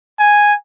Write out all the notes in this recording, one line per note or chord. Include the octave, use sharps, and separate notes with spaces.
G#5